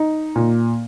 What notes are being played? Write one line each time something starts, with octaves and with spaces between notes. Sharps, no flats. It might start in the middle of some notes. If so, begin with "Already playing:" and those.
Already playing: D#4
A#2